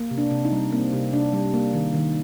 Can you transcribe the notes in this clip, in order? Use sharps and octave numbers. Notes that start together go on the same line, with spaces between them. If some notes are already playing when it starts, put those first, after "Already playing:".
Already playing: A#3
C3
D4
C3
D#4
G3
A#3 C4
C3
C3 D4
G3
A#3
D#3
D#3